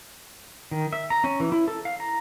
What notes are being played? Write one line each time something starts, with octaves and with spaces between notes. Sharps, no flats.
D#3
E5
A#5
C#4
E3
E4
A4
F5
A#5